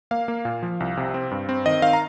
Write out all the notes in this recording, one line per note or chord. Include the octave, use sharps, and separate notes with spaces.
A#3 F5
A#3
A#2
F3
C2
C3
C4
G2
C4
D#3 D#5
D#3 F5
A#5